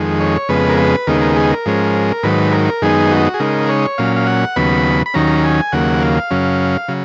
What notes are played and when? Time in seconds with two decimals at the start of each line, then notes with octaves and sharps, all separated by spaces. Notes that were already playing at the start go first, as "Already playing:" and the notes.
Already playing: F2 D#3 G#3
0.20 C#5
0.49 F2 C#3 G#3 B3 B4
0.69 A#4
0.78 B4
1.07 D#2 C#3 G#3 B3 D#4 A#4
1.21 A#4
1.36 G#4
1.51 A#4
1.66 G#2 F3 G#3 C#4
2.23 G#2 D#3 F#3 B4
2.53 A#4
2.82 F#2 D#3 G#3 B3 D#4 G#4
3.11 F#4
3.34 G#4
3.40 C#3 G#3 D#4 A#4
3.69 C#5
3.98 A#2 F#3 C#4 F5
4.16 F5
4.27 F#5
4.56 D#2 C#3 F#3 B3 B5
5.06 B5
5.14 D#2 D#3 F#3 C#4 A#5
5.44 G#5
5.72 D#2 C#3 F#3 A#3 F#5
6.02 F5
6.31 F#2 C#3 F#3 C#4
6.88 C#3 F#3